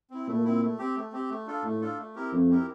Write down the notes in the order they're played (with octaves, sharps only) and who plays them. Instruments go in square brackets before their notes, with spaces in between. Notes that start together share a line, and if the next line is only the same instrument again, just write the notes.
[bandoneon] C4 E4
[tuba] A#2 [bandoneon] A3
[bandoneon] C4 E4
A3
C4 G4
A3
C4 G4
A3
D4 F4 A4
[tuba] A2 [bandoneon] A3
[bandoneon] D4 F4 A4
A3
C4 E4 G4 A#4
[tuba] F2 [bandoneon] A3
[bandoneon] C4 E4 G4 A#4